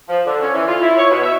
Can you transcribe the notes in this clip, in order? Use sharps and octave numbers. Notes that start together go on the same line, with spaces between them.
F3
D3
C#4
E3
F4
E4
C#5
B2
E5